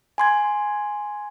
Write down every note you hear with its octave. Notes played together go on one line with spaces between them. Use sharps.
G#5 C6 G#6